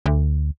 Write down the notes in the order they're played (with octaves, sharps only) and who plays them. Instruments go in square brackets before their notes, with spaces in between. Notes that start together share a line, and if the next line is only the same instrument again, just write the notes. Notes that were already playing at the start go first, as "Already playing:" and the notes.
[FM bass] D2